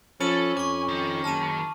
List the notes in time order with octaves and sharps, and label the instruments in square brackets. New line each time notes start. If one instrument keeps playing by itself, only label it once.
[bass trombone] F3 [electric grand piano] C#4 [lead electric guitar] A4 [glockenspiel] B5 D#7 F#7
[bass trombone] F2 [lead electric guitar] G#5 [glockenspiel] C#6 D6
[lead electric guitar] D#3
[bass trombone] F#1 [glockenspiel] A5 F6 D#7